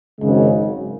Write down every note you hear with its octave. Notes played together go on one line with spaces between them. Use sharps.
G#1 F#2 C#3 G#3